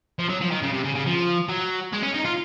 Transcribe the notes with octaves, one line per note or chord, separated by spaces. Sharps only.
F3
F#3
F3
D#3
C#3
C3
C#3
C#3
F3
F#3
G#3
C#4
D#4
F4